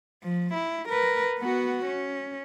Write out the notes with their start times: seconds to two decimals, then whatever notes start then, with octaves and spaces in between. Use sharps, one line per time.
0.23 F3
0.54 E4
0.89 A#4 B4
1.39 B3 F#4
1.86 C#4